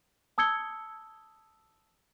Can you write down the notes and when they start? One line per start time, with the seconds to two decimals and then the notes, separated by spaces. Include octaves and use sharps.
0.38 A5 D#6 E6 G#6 C#7 G7